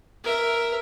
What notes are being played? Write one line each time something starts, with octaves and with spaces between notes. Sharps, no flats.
A#4 E5